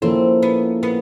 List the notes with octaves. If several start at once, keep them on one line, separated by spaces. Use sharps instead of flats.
F3 A#3 C4 C#4 E4 A4
B3
B3